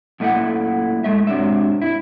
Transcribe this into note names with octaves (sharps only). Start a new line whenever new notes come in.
F#2 A#2 A3 E4 E5 F#5
A2 G#3 A3 E5
G#2 C3 F#3 D4 E5
E4